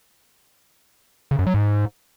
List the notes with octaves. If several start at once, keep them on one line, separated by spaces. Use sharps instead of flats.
C#3
F#2
F#3
G#2